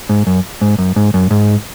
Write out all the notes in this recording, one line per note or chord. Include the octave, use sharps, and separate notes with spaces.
G#2
F#2
G#2
F#2
G#2
F#2
G#2